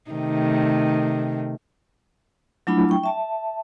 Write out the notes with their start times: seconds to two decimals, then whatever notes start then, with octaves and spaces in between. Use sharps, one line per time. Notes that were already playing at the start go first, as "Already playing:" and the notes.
0.10 C3 D#3 A3
2.67 F#3 A3 D4 E4 F4 B5
2.89 G5 C#6
3.04 E5 A5